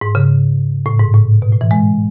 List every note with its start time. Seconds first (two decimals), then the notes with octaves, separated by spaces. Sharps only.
0.01 G#2
0.15 C#3
0.86 A2
0.99 G#2
1.14 A2
1.42 B2
1.52 A2
1.61 E3
1.71 G#3